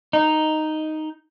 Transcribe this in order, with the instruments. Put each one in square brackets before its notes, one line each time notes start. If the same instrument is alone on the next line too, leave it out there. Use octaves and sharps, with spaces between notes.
[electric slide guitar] D#4